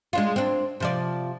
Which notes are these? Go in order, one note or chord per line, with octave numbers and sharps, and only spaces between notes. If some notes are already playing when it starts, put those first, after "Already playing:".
G#3 D4 F4
C4 D4
C3 F3 D5